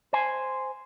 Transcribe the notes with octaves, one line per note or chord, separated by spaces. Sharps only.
C5 G#5